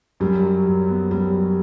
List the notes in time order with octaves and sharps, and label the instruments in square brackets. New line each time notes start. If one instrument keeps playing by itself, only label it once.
[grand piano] F#2 [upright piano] G3
[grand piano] F#3
F#2
B3
[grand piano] F#2 [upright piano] G3
[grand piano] F#3